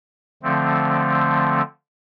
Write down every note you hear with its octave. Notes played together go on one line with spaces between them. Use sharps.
D3 F3 A3 C4